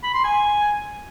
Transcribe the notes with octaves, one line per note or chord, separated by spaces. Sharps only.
B5
C6
G#5